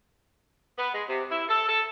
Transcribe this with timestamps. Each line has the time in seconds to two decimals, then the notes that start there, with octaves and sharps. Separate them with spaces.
0.78 B3
0.94 G#3
1.08 C3
1.30 E4
1.48 A4
1.68 A4